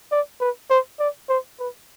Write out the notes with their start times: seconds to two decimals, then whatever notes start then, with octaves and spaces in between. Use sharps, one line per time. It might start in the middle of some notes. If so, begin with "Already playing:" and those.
0.12 D5
0.41 B4
0.70 C5
0.99 D5
1.29 C5
1.59 B4